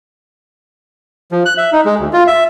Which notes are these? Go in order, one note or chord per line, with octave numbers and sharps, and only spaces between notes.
F3
F#6
E5
D#4
G#3
D2
F4
E5